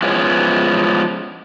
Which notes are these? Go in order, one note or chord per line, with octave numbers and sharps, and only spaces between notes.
F3 G#3 B3 C#4 E4